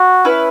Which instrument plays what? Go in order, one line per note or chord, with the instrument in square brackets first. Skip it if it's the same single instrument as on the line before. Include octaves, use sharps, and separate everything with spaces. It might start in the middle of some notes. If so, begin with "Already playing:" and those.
Already playing: [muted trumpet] F#4
[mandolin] C#4 E4 B4